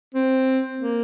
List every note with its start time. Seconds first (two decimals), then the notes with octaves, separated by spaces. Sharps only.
0.15 C4
0.80 A#3